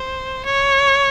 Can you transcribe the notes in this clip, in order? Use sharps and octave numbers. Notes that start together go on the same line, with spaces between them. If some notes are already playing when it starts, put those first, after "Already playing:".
Already playing: C5
C#5